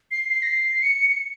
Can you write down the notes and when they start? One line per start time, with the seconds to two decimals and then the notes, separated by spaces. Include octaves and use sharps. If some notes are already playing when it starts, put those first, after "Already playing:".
0.11 C7
0.29 C7
0.43 A#6
0.47 C7
0.83 C#7